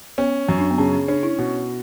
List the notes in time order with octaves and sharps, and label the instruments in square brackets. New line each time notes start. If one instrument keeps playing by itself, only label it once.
[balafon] B3 [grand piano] C#4
[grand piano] F#2
[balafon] D4
B3
[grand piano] C#3 [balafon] C#4
[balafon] C#4
[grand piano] C#4 [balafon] D4
[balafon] E4
[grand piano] B2